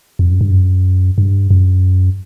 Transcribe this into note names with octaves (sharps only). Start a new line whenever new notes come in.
F2
F#2
G2
F#2
G2
F#2